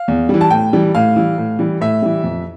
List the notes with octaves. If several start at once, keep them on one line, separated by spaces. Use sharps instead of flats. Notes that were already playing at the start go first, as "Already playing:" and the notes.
Already playing: F5
E2
E3 G3
A5
A2 G5
E3 G3
A2 F5
E3 G3
A2
E3 G3
A2 E5
E3 G3
F2